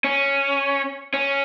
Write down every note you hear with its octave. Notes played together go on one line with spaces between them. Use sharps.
C#4
C#4